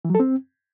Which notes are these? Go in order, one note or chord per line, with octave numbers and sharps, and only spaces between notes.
E3
F#3
A4
C4